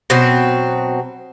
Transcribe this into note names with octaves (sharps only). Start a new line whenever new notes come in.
B2 F#3 C4